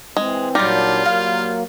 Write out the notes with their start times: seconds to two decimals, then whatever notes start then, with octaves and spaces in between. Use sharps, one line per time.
0.17 E3 G#3 C4
0.55 A#2 F#3 G3 D4 D#4 F4 D6
1.05 F#3 A#3 F5